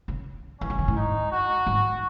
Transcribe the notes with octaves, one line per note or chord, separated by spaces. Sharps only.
C#3
E3 C#4
D#3
C#3
A2
G#2 D#4
F#4
G#2